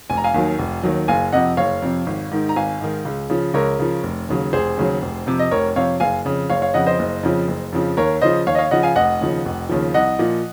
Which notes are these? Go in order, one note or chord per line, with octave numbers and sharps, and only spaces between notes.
F1 G#5
A#5
F5 G#5
D#2 D#3 F#3
F1
D#2 D#3 F#3
F#1 F5 G#5
F2 C3 D#5 F#5
F#1 C#5 F5
F2 C3
G#1
G#2 D#3
A#5
G#1 F5 G#5
G#2 D#3
C#2
C#3 F3
C#2 A#4 C#5
C#3 F3
F1
D#2 C#3 F#3
F1 G#4 C5
D#2 C#3 F#3
F1
F2 C3
D#5
F1 A#4 C#5
F2 C3 C#5 F5
F#1 F5 G#5
F2 C#3
F#1 C#5 F5
C#5 F5
F2 C#3 D#5 F#5
C5 D#5
F#1
F2 C#3 F3
F#1
F2 C#3 F3
D#2 A#4 C#5
C#3 F3 C5 D#5
D#2 C#5 F5
D#5
C#5 F5
C#3 F3 D#5 F#5
F5 G#5
F1 D#5 F#5
D#2 C#3 F3
F1
D#2 C#3 F3
C2 D#5 F#5
A#2 F3